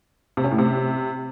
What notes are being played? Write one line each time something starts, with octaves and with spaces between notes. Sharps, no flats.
C3
C#4
A2
C3